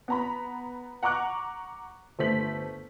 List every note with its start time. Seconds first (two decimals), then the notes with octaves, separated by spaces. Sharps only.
0.08 B3 A#5 B5
1.03 F#5 A#5 C#6 D6 F#6
2.19 G1 A3 C5 B6 F#7